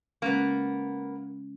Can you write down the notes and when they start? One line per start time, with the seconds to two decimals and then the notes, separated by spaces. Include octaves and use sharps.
0.22 C#3 G#3 A#3 B3 C#4